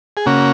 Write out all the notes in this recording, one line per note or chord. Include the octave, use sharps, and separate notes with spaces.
G#4
C#3 A#3 C#4 F#4